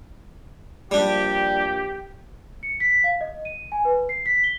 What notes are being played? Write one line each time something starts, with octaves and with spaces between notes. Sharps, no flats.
A#1 G3 D4 G4
C#7
B6
F5
D#5
D#7
G#5
B4
C7
B6
G7